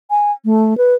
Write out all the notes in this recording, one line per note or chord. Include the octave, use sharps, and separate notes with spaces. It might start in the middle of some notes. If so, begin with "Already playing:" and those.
G#5
A3
B4